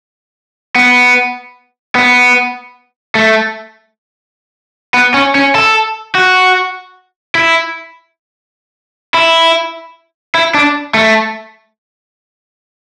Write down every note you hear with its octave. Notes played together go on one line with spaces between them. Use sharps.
B3
B3
A3
B3
C#4
C#4
A4
F#4
E4
E4
E4
D4
A3